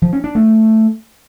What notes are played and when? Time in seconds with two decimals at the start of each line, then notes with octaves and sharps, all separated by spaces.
0.02 F3
0.13 C#4
0.24 D4
0.35 A3